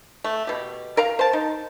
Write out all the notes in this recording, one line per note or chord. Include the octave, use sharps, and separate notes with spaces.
A3
B2 G4
A#4 F5 A#5
C5 A5
D#4